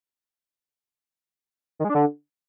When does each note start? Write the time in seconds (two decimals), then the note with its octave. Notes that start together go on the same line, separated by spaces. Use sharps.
1.79 D#3
1.84 G#3
1.90 D4
1.95 D3